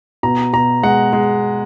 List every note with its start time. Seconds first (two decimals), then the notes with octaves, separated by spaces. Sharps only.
0.23 B2 A#5
0.53 B2 A#5
0.83 G#3 F#5
1.13 G#3